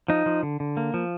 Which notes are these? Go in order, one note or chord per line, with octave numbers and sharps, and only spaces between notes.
F3 D#4
F3
D3
D3
A#3
F3